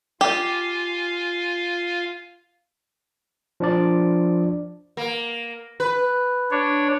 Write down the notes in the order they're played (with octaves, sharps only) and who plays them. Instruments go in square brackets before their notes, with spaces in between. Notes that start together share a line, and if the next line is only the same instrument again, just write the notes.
[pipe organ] F4 F5 G#5 [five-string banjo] G4
[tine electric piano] F3 D4 D5
[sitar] A#3
B4
[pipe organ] D4 C#5